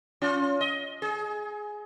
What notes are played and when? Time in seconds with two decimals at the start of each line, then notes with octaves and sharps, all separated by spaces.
0.22 C#4 F4
0.61 D#5
1.02 G#4